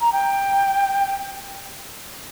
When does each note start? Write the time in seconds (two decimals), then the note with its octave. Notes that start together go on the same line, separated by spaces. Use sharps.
0.01 A#5
0.12 G5